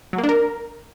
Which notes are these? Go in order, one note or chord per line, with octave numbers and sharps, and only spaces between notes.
F#3
A#3
D4
A#4